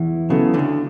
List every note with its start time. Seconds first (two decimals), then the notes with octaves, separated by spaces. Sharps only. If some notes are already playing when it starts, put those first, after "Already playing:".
Already playing: E2 E3
0.30 C#3 F#3 B3 E4 A4
0.54 D2 D3